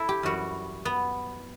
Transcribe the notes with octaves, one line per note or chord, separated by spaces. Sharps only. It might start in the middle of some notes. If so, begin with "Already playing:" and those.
Already playing: E4 A4
G4
F#2 E3 G3 F#4
B3